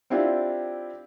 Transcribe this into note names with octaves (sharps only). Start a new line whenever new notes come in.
C4 D4 E4 F4 G4